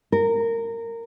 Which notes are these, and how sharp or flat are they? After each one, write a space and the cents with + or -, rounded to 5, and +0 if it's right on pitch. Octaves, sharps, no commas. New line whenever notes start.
A#4 -20